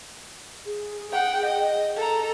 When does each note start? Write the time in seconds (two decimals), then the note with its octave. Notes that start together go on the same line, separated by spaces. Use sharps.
0.66 G#4
1.12 F#5 G5
1.45 D#5
1.96 A4 A#5